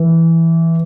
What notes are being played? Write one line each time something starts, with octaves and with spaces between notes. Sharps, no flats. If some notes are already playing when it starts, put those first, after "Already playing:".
Already playing: E3